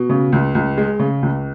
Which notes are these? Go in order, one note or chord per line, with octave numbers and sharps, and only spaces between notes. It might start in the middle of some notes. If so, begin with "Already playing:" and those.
Already playing: B2
C#3
C#2
C#2
G#3
C#3
C#2